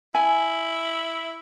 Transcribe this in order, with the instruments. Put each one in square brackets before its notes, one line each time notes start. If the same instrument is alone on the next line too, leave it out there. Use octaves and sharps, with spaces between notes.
[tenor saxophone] E4 [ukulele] G#5